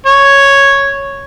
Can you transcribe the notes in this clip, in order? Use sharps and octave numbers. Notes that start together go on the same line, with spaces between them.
C#5